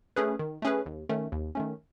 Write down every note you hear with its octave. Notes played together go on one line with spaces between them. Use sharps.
A3 C#4 G#4 B4
D#3
A3 C#4 G#4 B4
D#2
D#3 A3 C#4
D#2
D#3 A3 C#4